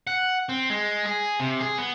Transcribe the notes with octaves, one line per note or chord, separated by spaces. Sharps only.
F#5
C4
G#3
G#4
C3
G#4
B3